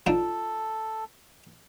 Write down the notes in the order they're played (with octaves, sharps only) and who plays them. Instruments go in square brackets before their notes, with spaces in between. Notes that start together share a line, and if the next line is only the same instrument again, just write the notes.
[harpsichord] F3 D4 D#4 [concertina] A4